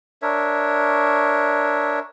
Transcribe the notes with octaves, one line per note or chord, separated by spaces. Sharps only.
D4 A#4 C#5 E5